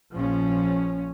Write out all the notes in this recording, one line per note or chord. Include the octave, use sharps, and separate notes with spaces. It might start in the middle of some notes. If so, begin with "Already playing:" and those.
A#1 F3 C#4